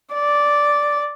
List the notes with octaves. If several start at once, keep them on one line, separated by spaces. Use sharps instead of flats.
D5